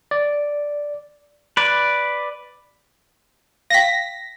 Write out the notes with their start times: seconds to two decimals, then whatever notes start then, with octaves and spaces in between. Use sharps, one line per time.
0.11 D5
1.57 B4 D5
3.70 F5 G5 A#6 B6